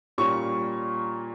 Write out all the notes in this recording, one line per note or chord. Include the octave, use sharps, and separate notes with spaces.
A#2 G3 A#3 C#4 C#6